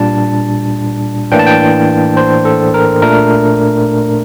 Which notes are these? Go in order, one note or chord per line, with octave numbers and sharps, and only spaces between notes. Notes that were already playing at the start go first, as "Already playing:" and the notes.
Already playing: A#2 G3 D4 A5
A2 E3 A#3 D4 G5
A5
G5
C5
A4
A#4
A#2 A3 D4 A#4